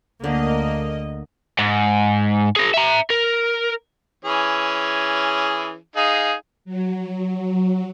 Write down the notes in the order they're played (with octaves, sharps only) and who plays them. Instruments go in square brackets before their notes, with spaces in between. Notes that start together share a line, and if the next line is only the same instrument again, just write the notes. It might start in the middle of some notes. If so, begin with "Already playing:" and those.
[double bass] D2 [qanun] D3 [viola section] A#3 D#5
[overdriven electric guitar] G#2
G#4 A#4
E5 A#5
A#4
[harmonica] E3 C#4 G#4
D#4 G#4 F5
[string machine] F#3
F#3